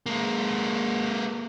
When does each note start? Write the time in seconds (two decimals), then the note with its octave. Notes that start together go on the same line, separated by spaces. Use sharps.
0.06 G#3 A#3